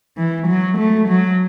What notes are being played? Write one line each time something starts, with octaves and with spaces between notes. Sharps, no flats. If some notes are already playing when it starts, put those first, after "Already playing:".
E3
F#3
A3
F#3